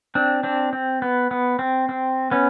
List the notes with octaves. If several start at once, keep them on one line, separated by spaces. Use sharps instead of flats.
C4 D4
C4 D4
C4
B3
B3
C4
C4
B3 C#4